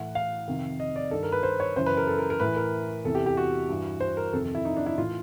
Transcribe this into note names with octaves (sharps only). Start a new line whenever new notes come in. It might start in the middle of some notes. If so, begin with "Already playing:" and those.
Already playing: A2 E3 F#5
F5
F2 C3 D#3
D#5
D5
G2 D#3 A4
A#4
B4
C5
C#5
F#2 C#3 E3 C5
B4
A#4
A4
A#4
A#4
A2 E3 B4
A#4
E2 C3 E3 A4
G4
G4
F#4
G2 E3
C5
A#4
F2 C3 D#3 A4
A4
E4
D#4
D4
E4
A2 E3 F4